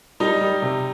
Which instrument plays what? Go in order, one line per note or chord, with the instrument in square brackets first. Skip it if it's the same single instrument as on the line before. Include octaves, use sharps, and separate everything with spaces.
[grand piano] G3 D#4
G3
C3